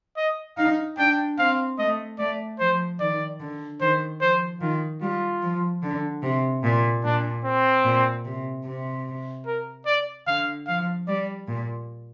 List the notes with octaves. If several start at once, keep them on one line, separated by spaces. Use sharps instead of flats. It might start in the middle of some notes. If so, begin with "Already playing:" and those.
D#5
D#4 F5
D4 G5
C4 F5
A3 D#5
A3 D5
F3 C5
D#3 D5
D3
D#3 C5
F3 C5
D#3 F4
G3 F4
F3
D3
C3
A#2
A#2 D4
C4
A#2
C3
C3
A#4
D5
D3 F5
F3 F5
G3 D5
A#2